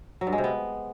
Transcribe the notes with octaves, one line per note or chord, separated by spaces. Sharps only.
F#3
G2
G#3
C3
B3